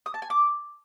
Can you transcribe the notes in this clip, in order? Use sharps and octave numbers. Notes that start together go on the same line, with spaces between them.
D#6
A5
G#5
D6